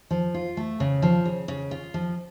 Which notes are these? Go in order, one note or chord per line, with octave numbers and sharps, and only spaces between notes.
F3
F4
A3
C#3
F3
C#3
C#3
F4
F3